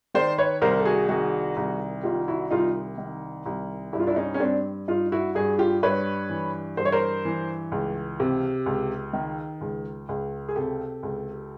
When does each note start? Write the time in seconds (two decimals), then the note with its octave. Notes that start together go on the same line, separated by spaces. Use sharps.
0.14 D#3 C5 D5
0.38 B4 C#5
0.62 C2 A#4 C5
0.80 A4
0.85 F#4 G#4
1.09 D#3 F#4 G#4
1.57 C2
2.03 D#3 F4 G4
2.28 E4 F#4
2.51 C2 D#4 F4
2.98 D#3
3.46 C2
3.93 G2 E4
4.00 F4
4.07 D4 E4
4.16 C#4 D#4
4.34 C#4
4.40 G2 C4 D4
4.88 G2 D#4 F4
5.12 E4 F#4
5.35 G2 F#4 G#4
5.58 F4 G4
5.83 G2 B4 C#5
6.29 E3
6.77 G2 C5
6.85 C#5
6.92 A#4 C5
7.25 E3
7.72 C#2
8.20 C3
8.66 C#2
9.13 D#3
9.61 C#2
10.09 C#2
10.49 G#4
10.55 C3 G4 A4
11.03 C#2